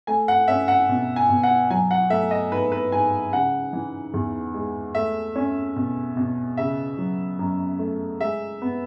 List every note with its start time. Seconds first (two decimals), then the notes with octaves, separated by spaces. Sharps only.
0.07 A3 G#5
0.28 F#5
0.48 C#4 E5
0.68 F#5
0.89 B2
1.16 G#5
1.29 B2
1.43 F#5
1.70 F#3 G#5
1.91 F#5
2.10 A3 E5
2.31 D#5
2.51 G#2 B4
2.72 B4
2.92 G#2 G#5
3.32 C#3 F#5
3.73 E3
4.14 E2
4.54 G#3
4.95 A3 E5
5.36 C#4
5.76 B2
6.17 B2
6.57 C#3 E5
6.98 F#3
7.39 F#2
7.79 A3
8.20 G#3 E5
8.62 B3